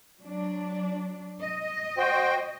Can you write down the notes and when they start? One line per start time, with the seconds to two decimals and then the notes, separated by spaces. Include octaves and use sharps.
0.20 F#3 D4
1.40 D#5
1.97 F#4 C5 G5